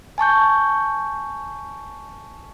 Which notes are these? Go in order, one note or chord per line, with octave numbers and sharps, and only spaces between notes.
G#5 A5 C#6 G6